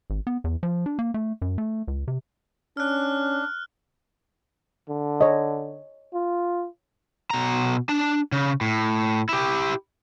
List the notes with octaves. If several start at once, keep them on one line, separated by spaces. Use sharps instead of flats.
G#1
B3
E2
F3
D4
A#3
A3
F#2
A3
C#2
C3
C#4 D4 F6 F#6
D3
C#5 D#5
F4
B2 A#5
D4 A5
C#3
A2
E4 G4